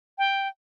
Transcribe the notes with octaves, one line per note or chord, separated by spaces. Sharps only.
G5